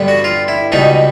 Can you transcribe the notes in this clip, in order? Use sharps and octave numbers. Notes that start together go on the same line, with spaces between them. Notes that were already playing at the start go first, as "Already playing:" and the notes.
Already playing: G2 D3 G3 B3
F#4
F4
E4
C#2 B2 G3 B3 D#4